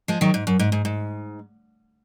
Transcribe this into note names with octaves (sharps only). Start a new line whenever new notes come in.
F3 G#3
D#3 F#3
G#2
F#2
G#2
G#2
G#2